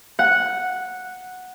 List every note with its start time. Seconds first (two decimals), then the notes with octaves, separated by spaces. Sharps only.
0.19 F#5